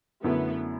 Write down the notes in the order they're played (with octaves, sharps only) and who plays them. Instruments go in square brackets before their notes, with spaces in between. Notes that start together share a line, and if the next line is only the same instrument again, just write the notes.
[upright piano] F#2 D3 A3 E4 [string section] B3